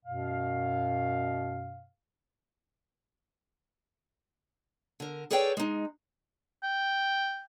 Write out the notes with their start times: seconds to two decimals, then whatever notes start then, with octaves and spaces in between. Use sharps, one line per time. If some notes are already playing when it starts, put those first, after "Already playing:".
0.06 F#2 B2 F5
5.00 D3 A#4
5.31 G#4 A4 B4 C#5 D5 G5
5.57 G#3 D#4
6.63 G5